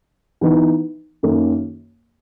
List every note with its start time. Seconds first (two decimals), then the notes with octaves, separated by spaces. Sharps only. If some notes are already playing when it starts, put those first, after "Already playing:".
0.41 E3 B3 D#4
1.23 F#2 D#3 A#3 C#4